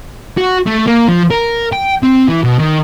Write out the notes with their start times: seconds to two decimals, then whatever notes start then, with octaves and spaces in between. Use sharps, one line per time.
0.38 F#4
0.67 A3
0.88 A#3
1.09 F3
1.31 A#4
1.72 G5
2.03 C4
2.28 E3
2.44 B2
2.58 D#3